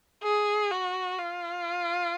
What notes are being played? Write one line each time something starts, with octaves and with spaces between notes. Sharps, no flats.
G#4
F#4
F4